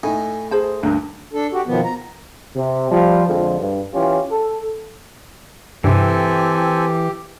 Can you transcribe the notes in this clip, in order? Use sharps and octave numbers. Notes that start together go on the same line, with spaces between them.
A2 D#4 G#5
G#4 C5 A5
D2 G2 D4 A#4
D4 A4
F#4 G4
B2 D#3 F3 B3
A#5
C3
F3 G3
F2 D3 F3 G#3
G2
E3 C#4 F4 G4
A4
G2 C3 E3 C4 G4 A4 G#5